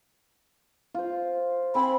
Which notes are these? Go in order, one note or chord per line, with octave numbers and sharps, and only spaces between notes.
F4 C5
C4 G#5 B5 C6